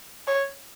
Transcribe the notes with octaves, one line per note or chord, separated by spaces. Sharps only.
C#5